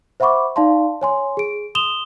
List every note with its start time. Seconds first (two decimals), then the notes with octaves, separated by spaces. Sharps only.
0.20 C5 E5 F#5 B5 C#6 D6
0.56 D#4 D5 F5 A5 C6
1.01 C#5 G#5 C6
1.37 G#4 D7
1.75 C6 D#6 E7 F7 G7